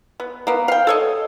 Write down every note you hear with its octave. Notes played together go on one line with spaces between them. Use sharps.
B3
A#3 B3
F5 G5
A4 C#5 D#5